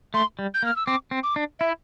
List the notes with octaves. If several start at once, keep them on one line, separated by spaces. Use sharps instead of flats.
A3 C6
G3
G6
A#3
F6
E6
C4 D6
C4
D6
D4
E4 E5